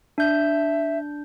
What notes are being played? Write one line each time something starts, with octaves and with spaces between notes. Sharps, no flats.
D4 E5 G6